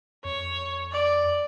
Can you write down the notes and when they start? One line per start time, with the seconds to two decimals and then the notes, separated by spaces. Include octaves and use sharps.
0.24 F2 C#5
0.92 D5